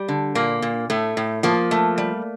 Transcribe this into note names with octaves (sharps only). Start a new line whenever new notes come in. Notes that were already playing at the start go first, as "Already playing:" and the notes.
Already playing: G3
D3
A#2 A#3
A#2
A2 A3
A2
F3 A#3
A3
G3